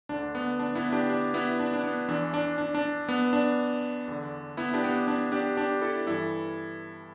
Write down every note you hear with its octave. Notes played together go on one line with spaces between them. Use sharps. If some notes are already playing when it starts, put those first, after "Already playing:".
D2 D3 D4
B3
D4
B3 E4
D4 G4
D4
B3 E4
D4
D4
B3
E2 E3 D4
D4
D4
D4
B3
D4
E2 D3
B3 E4
D4 G4
B3
D4
D4
D4 G4
D4 G4
E4 A4
G2 E3 E4 A4